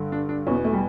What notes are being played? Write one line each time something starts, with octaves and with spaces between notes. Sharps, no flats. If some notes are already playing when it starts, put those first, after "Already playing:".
Already playing: G2 D3
D4
D4
E2 B2 C#4
B3
A3
G3